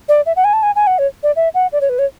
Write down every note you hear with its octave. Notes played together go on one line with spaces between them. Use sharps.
D5
E5
F#5
G#5
A5
G#5
G#5
F#5
C#5
D5
E5
F#5
D5
C#5
B4
C#5